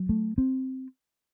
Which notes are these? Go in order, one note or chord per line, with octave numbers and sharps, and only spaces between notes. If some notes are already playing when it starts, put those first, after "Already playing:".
Already playing: F#3
A3
C4